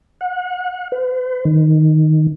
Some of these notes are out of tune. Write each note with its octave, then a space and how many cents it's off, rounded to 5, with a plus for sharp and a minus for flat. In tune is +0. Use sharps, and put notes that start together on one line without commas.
F#5 -35
B4 +45
D#3 +0